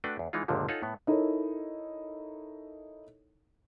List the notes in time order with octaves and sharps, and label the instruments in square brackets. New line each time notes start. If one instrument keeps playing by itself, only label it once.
[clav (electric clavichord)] A3 D4 F#4 B4 G5
E2
E3 G#3 D#4 F4
G1 C#2 A#2 D3 F3
D#4 F4 A4 C#5 F#5 G#5
A2 B3
[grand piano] D#4 E4 A4 A#4 C#5